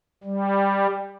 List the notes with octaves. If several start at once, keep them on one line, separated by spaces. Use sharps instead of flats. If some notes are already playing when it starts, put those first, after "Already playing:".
G3